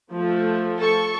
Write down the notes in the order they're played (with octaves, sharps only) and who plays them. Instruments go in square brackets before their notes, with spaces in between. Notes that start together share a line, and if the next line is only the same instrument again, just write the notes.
[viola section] F3 A3
[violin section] A4 C#6